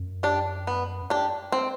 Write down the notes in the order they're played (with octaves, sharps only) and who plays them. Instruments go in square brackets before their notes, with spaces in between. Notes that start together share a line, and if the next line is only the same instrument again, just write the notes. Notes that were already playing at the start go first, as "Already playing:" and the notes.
Already playing: [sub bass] F#2
[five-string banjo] D4 G4
B3
D4 G4
C4